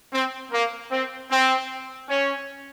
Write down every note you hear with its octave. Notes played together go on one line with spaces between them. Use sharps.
C4
A#3
C4
C4
C#4